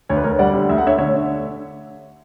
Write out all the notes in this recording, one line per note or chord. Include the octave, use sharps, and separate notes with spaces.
D2 C#5
B4
D2 A#4 C#5
G3 D5 F#5
D3
D2 E5
F#5
D3 C#5 E5
D3 C#5 E5
D3